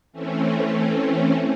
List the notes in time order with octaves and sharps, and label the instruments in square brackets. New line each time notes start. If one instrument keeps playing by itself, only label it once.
[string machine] E3 A3 C4 C#4